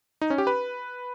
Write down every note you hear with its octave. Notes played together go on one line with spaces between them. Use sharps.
D#4
C#4
G4
B4